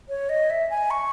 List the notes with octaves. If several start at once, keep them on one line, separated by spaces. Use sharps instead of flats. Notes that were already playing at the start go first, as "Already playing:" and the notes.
C#5
D#5
E5
G#5
C#6